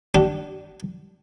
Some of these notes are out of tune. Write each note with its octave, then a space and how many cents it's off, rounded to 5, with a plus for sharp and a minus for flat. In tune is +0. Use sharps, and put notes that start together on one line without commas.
D4 +0 G4 -35